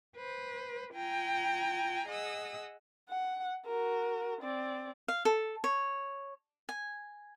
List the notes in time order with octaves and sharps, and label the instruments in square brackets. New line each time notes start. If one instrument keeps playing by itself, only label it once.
[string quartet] B4 C5
F4 G5 G#5 A#5
G#4 D#5 F#5 D#6 E6
[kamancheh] F#5
F#4 A#4
C4 D5
[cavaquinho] F5
A4
C#5
G#5